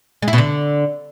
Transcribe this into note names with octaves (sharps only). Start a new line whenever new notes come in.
G#3
E4
B2
D3